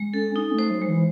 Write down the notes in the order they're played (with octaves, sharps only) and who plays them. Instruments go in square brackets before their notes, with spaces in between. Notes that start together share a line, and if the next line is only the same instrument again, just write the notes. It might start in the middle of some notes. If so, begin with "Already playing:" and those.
Already playing: [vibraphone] G#3
[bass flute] C#4 [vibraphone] A4
[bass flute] C#4 [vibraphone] D#4
[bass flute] A3
[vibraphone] C5
[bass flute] F#3
[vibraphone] G#3
[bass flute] E3